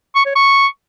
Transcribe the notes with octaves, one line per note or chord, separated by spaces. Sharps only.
C#6
C#5
C#6